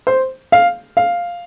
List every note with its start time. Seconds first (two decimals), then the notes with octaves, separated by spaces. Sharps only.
0.07 C5
0.52 F5
0.97 F5